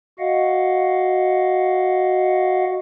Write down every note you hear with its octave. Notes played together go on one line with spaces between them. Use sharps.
F#4 D#5 F5 F#5